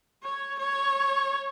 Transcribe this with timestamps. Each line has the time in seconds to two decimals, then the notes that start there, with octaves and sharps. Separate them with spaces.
0.23 C#5
0.58 C#5